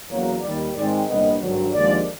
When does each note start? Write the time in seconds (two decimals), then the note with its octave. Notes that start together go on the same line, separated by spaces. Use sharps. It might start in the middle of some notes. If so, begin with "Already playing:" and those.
0.09 E2 C#3 F#3 A#3 C#5
0.42 D#2 D#3 G3 D5
0.74 G#2 D#3 G#3 C4 D5
1.07 C2 A#2 G3 B3 D4 D#5
1.39 G#1 G2 D3 F#3
1.72 D#2 D3 F3 G#3 D5